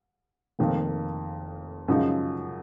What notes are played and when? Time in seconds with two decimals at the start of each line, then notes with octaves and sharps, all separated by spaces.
0.59 F1 F2 D#3 A#3
1.88 F#2 C#3 F3 G#3 D#4